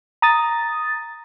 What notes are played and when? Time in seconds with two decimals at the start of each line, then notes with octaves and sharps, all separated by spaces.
0.22 A#5 D#6 A6